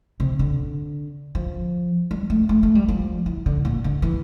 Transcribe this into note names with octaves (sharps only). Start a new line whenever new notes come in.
C3
D3
F3
G3
A3
A3
A3
G3
F3
E3
D3
A#2
D3
E3